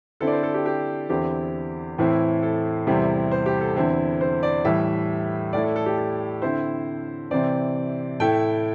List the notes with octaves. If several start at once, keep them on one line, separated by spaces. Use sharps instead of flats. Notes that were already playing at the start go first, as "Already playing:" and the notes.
D3 C4 E4 A4
D5
C5
A4
G4
G4
E2 D3 C4 E4 G4
A2 E3 C4 E4
A4
E2 C3 G3 C4 E4
C5
G4
A4
E2 D3 C4 E4
C5
D5
A2 E3 G3 E5
A2 A3 E4 D5
A4
A4
G4
A4
D3 C4 E4 C5
C3 E3 C4 D5
A2 A3 E4 G5